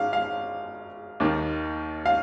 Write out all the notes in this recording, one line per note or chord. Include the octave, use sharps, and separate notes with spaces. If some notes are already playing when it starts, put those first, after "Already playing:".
Already playing: G#1 G#2 G#3 F5
F5
D#2 D#3 A#3
F5